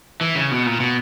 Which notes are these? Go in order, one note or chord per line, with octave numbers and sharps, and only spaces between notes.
E3
C#3
B2
A#2
B2